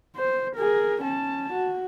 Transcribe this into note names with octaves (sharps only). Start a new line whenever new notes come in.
C5
G#4 A#4
C#4 A5
F#4